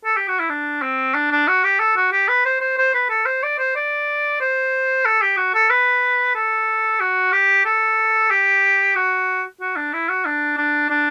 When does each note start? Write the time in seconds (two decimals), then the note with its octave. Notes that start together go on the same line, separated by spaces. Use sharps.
0.05 A4
0.17 G4
0.28 F#4
0.40 E4
0.49 D4
0.82 C4
1.14 D4
1.31 D4
1.48 F#4
1.64 G4
1.79 A4
1.96 F#4
2.12 G4
2.28 B4
2.45 C5
2.61 C5
2.78 C5
2.94 B4
3.09 A4
3.26 C5
3.43 D5
3.59 C5
3.76 D5
4.41 C5
5.05 A4
5.22 G4
5.37 F#4
5.54 A4
5.70 B4
6.35 A4
7.00 F#4
7.33 G4
7.65 A4
8.31 G4
8.95 F#4
9.61 F#4
9.76 D4
9.93 E4
10.09 F#4
10.25 D4
10.57 D4
10.90 D4